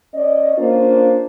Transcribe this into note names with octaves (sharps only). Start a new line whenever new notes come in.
C#4 D5 D#5
A#3 C#4 D4 F4 C5